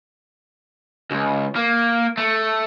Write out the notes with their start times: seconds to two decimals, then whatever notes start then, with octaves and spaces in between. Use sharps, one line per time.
1.11 C#2
1.55 A#3
2.18 A3